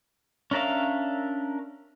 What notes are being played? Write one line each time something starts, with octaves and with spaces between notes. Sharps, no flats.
C#4 D4 A#4 E5 F5